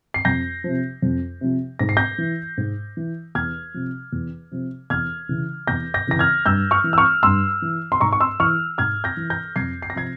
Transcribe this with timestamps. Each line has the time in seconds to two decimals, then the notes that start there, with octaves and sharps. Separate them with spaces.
0.14 C7
0.25 F2 G6 A#6
0.64 C3 F3
1.02 F2
1.41 C3 F3
1.79 G#2 A#6
1.89 C7
1.97 G6 A#6
2.18 E3
2.57 G#2
2.97 E3
3.35 E2 F6 G#6
3.74 C3 F3
4.13 E2
4.51 C3 F3
4.90 E2 F6 G#6
5.29 C#3 E3
5.67 E2 G6 A#6
5.94 G6 A#6
6.07 C#3 E3 A#6
6.19 F6 G#6
6.45 G2 E6 G6
6.71 C#6 F6
6.84 E3
6.93 E6
6.98 C#6 F6
7.23 G2 C6 E6
7.62 E3
7.92 C6
8.00 G#2 A#5 C#6
8.13 C#6
8.20 C6 E6
8.40 E3 C#6 F6
8.78 G#2 F6 G#6
9.04 G6 A#6
9.17 E3
9.30 G6 A#6
9.56 F2 G#6 C7
9.82 C7
9.90 A#6
9.95 C3 F3 G#6 C7